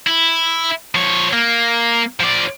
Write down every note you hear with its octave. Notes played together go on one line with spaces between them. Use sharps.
E4
F3 C#5
A#3
F3 D5